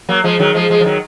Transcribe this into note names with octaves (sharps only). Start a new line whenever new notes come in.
F#3 A#3
F3 G#3
D#3 F#3
F3 G#3
F3 G#3
F3
D#3 F#3